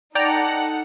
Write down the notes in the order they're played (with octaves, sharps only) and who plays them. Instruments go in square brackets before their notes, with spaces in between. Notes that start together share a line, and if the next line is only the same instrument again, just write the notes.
[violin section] D#4 A4 F#5 [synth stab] D5 G5 A#5